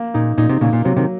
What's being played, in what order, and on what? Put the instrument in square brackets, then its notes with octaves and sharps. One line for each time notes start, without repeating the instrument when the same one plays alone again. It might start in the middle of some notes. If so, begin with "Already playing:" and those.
Already playing: [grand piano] A#3
[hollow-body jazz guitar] A#2 [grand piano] D#4
[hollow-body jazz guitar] A#2 [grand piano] D#4
[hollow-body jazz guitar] C3
[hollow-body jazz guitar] A#2 C#3 [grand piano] A#3
[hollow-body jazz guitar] A#2
[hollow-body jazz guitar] C3 [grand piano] F#3
[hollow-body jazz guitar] C3 D#3